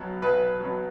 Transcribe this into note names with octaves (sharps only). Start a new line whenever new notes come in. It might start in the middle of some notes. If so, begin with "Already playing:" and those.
Already playing: B1 B2 F#3
B1 B4
B2 F#3